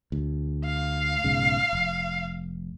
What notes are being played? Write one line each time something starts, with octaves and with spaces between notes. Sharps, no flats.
D2
F5
B1 G#2 C#3
F1